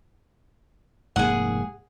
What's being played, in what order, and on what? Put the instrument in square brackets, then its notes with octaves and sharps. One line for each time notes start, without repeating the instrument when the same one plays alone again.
[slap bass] F1 G#2 A#3 [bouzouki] G#4 F#5